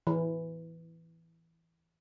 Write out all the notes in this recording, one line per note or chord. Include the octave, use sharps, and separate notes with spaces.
E3